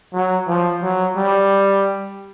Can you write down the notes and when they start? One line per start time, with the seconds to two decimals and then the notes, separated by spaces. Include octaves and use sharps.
0.14 F#3
0.48 F3
0.83 F#3
1.17 G3